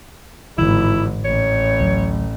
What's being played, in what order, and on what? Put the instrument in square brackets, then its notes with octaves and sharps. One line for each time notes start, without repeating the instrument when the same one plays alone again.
[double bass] G#1 [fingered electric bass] A2 D3 E3 [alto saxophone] E4
[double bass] A1 [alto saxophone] C#5
[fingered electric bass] D2 F#3